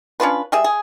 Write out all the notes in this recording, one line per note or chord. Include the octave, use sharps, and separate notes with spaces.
C#4 D4 F4 B4
G3 G#4 E5
G#4